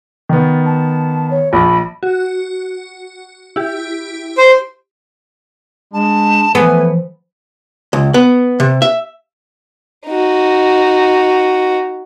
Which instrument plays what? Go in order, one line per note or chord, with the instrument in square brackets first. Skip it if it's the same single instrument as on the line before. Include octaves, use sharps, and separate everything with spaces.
[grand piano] D#3 B3
[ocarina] A5
C#5
[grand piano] A#1 [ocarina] B5
[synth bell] F#4
E4 G4
[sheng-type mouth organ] C5
[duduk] G#3 [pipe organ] D4 [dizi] A5
[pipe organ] E3 F3 [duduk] A3 [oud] B3 [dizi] G#5
[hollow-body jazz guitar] C#2
B3
C3
E5
[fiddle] D#4 F#4